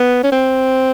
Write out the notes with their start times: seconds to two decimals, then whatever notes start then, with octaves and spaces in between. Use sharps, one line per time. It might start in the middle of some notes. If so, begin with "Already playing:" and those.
Already playing: B3
0.23 C#4
0.32 C4